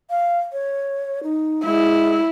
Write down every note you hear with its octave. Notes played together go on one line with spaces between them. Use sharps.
F5
C#5
D#4
G#3 E4